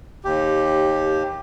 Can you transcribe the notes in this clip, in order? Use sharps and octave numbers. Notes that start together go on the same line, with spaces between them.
D#2 G4